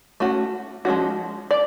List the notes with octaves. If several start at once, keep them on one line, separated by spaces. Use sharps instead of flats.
A3 C#4 F#4
F3 G#3 C#4 F#4
D5